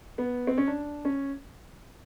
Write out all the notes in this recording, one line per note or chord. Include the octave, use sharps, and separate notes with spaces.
B3
C4
C#4
D4
C#4